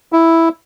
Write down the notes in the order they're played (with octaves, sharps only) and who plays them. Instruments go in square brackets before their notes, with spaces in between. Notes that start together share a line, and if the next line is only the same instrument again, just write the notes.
[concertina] E4